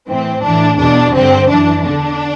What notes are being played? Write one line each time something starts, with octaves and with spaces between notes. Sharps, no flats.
A2 E3 C4
A2 E3 D4
E2 B2 D4
G2 D3 C4
F#2 E3 D4
E2 D3 D4